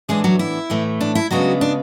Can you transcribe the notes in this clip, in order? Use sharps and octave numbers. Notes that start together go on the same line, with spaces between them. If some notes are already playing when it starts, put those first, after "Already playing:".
A2 E3 G#3 B3 D4 G#4
F#3 F#4
E4
A2 E3 A3
D4
E4
C#3 F#3 G#3 B3 D4 F#4
D4